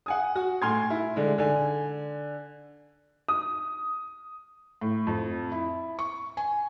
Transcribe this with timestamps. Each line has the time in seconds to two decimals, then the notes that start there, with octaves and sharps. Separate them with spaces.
0.06 F#5 G#5 D#6
0.35 F#4
0.62 A2 G#5 C6 F6 G#6
0.90 E4
1.16 D3 G#3
1.38 D3 G#5
3.28 D#6
4.81 A2
5.07 F2
5.52 E4
5.99 C#6
6.37 G#5